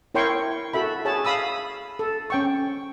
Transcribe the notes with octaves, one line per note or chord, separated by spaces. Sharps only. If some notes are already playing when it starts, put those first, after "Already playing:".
E4 A#4 C#5 G5 C6 C#6
F#4 A4 E5 B5
G#4 C#5 A5
F5 B5 D#6 E6
A4
C#4 G5 C#6